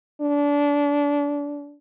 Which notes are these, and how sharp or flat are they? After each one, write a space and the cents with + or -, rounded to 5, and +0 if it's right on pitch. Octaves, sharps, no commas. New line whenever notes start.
D4 -25